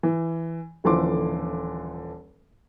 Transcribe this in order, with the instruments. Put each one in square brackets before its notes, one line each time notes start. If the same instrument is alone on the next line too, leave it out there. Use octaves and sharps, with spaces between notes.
[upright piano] E3
D#1 D3 E3 F3 C6 D6